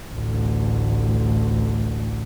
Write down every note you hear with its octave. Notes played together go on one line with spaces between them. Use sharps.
A1 D2